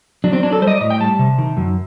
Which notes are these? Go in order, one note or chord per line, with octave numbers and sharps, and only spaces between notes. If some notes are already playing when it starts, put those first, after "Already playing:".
F#3 D4
C4
F#3 D4
A4
G3 C5
D#5
D5
A2 D#5
G5
G3 A5
C3
D#3
F#2